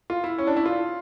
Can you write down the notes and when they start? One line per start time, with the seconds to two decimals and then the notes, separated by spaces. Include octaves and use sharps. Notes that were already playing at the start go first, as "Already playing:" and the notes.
0.10 F4
0.24 E4
0.38 C#4
0.47 D4
0.56 E4
0.66 F4